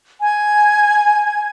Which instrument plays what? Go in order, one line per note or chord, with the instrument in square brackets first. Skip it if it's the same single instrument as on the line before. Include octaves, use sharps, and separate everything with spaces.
[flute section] G#5 G#6